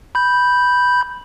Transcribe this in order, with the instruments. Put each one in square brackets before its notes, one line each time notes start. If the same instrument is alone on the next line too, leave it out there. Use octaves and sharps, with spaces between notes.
[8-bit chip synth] B5 G6